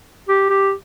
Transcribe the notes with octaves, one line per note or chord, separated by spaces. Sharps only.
G4
G4